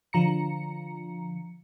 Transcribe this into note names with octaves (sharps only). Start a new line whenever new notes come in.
D3 F3 A#5 C#7